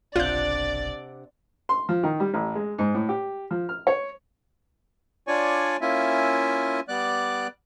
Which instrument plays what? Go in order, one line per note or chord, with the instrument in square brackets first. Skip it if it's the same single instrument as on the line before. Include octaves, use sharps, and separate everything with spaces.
[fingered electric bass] F#1 B1 [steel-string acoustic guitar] C3 D4 F#5 [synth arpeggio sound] F4 G6 [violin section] D5
[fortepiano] C6
F3
D#3
G3
A1
G#3
G#2
A2
G4
F3
F6
C#5
[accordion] D4 F4 C#5 D5 G#5 C#6
A#3 C#4 E4 F4 E5 G#5
G3 B3 D5 D6 F#6